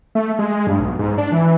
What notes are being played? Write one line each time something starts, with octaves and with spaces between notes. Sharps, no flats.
A3
G#3
G2
B1
G#2
D4
E3